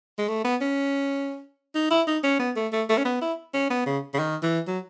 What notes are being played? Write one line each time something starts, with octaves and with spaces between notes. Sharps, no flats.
G#3
A3
B3
C#4
D#4
E4
D#4
C#4
B3
A3
A3
A3
C#4
B3
E4
C#4
B3
C#3
C#3
D#3
E3
F#3